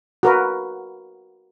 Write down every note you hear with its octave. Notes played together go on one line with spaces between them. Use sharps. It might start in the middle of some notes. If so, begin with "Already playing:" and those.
F#4 A#4 B4